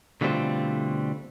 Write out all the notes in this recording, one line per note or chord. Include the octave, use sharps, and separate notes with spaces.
B2 D3 G3 A3 C4 F4